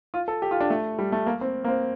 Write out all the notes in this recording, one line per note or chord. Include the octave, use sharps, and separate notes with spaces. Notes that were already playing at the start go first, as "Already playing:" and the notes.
F4
A4
G4
F4
D4
A3
G3
A3
A#3
C4
A#3
C4